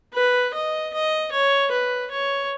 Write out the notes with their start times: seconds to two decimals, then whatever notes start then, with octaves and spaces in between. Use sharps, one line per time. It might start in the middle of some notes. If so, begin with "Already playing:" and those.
0.14 B4
0.54 D#5
0.93 D#5
1.32 C#5
1.71 B4
2.11 C#5